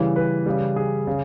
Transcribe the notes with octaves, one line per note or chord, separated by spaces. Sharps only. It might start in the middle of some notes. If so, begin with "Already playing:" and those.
Already playing: C#3 E3 G3
B4
C#3 G3
G#4
C#3